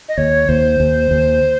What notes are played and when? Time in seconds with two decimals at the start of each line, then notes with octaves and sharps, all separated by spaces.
0.09 D#5
0.18 D#2 C#5
0.49 D#2 C5
0.80 D#2
1.11 D#2